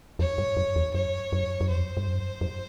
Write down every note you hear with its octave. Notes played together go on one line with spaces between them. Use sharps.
F2 C#5
G2
F#2
E2
F#2 C#5
F#2
F#2
F2 C5
G2
F#2
F#2